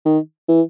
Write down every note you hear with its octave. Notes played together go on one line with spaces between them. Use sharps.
D#3
E3